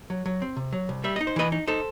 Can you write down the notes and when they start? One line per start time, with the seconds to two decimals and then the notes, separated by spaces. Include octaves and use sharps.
0.10 F#3
0.26 F#3
0.42 C4
0.57 C3
0.73 F#3
0.89 C2
1.04 G3 E5
1.16 D#4 D#5
1.27 C5
1.36 E3 B4 D#5
1.52 D#4
1.67 D#4 A4 C5